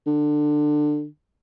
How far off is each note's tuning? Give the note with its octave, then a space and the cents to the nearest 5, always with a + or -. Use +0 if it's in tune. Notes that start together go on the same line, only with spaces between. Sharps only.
D3 +20